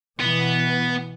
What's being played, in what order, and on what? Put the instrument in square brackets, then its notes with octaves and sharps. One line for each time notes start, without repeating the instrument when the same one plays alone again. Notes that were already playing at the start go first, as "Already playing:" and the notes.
[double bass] B2 E3 [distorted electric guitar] B3